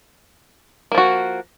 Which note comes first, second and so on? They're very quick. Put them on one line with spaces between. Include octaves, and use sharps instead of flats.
A#3 F3 F#4